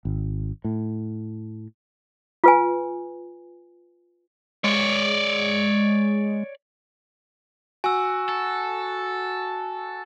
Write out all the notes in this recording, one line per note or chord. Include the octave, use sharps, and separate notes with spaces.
G#1
A2
F4 B4 G#5
G#3 C#5 D5
F#4 G#5 E6
A4